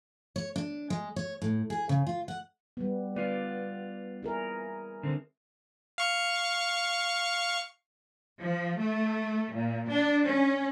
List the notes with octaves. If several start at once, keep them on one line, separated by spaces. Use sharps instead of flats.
C#5
D4
G#3
C#5
A2
G#4
C#3
F4
F#5
G3 B3
B3 F4 D5
E4 G#4 A#4
D3 C4
F5 C#6
F3
A3
A#2
D4
C#4